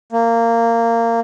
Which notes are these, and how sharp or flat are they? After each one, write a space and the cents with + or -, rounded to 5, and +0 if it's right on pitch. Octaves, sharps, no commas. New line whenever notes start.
A#3 -15